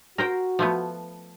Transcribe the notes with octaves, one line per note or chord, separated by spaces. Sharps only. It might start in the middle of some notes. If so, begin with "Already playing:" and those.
F#4 A#4 C5 G5
F3 A3 B3